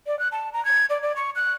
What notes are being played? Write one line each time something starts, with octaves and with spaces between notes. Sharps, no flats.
D5
F#6
A5
A#5
G#6
D5
D5
C#6
F#6